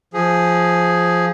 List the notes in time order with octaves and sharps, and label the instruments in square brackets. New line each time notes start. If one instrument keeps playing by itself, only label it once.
[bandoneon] F3 G#4